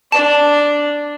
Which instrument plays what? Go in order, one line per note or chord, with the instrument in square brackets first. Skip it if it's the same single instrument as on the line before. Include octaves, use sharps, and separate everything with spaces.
[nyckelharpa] D4 D5 [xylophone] A5